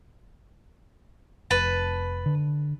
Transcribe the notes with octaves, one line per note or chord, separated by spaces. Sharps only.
F1 B4 A5
D3